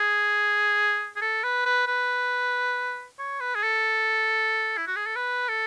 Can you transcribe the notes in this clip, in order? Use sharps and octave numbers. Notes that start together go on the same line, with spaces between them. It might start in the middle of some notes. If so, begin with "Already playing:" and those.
Already playing: G#4
G#4
A4
B4
B4
B4
C#5
B4
G#4
A4
E4
F#4
G#4
A4
B4
A4